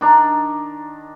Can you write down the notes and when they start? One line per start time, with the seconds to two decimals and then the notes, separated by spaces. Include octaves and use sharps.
0.01 D#3 D4 A#5